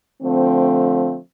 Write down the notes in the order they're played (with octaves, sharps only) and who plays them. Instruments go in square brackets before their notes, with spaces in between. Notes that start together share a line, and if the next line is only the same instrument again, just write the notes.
[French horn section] D3 F3 A3 C4